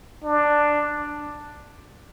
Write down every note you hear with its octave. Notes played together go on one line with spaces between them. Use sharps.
D4